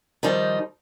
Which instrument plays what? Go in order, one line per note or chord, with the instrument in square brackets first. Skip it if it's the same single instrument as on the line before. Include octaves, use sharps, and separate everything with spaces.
[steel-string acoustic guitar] D#3 F3 G3 D#4